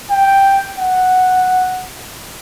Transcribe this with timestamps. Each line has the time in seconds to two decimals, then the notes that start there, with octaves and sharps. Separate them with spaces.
0.11 G5
0.78 F#5